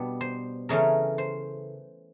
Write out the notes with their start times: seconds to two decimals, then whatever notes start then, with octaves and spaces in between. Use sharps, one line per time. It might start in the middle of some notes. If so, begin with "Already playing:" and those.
Already playing: B2 G3 B3 D4
0.21 C5
0.69 C#3 E3 A3 C#4 A#4
1.18 C5